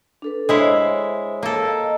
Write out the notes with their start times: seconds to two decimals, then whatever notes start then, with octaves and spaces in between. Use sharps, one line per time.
0.22 D4 A4 B4
0.49 G#3 E4 C5 C#5 E5 F5
1.43 A#3 A4
1.63 A#4 D#5 A#5